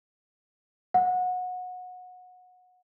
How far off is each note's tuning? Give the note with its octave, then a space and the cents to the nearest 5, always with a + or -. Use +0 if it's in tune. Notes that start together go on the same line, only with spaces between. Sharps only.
F#5 -25